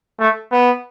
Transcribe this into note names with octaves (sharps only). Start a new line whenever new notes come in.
A3
B3